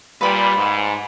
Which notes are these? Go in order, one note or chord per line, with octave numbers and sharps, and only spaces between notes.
A#2 G3 B4 B5 C6
G#2